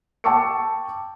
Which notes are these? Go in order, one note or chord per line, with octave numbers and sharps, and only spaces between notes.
G5 A5 C#6 D6 E6 C#7